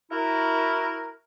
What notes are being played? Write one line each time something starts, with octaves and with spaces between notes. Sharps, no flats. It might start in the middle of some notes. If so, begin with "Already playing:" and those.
E4 F#4 A#4